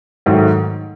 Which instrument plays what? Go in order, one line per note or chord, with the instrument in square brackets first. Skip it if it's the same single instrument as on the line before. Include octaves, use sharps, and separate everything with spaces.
[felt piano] G#2 D#3 F#3 A3